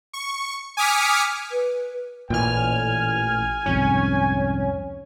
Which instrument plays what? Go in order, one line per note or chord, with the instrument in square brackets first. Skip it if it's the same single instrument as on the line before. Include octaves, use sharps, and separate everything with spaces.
[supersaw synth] C#6
G#5 D6 D#6 F6 B6 C#7
[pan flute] B4
[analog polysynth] A1 F6 [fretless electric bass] A#2 E3 [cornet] G#5
[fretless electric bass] C2 F2 G#2 [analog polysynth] C#4